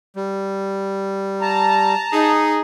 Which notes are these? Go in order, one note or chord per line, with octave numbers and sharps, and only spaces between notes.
G3
A5 A#5
D#4 G#4